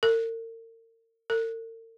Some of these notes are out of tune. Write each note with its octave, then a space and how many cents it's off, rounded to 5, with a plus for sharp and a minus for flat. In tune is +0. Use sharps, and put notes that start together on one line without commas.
A#4 -40
A#4 -45